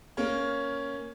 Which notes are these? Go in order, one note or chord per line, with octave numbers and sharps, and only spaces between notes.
A#3 C#4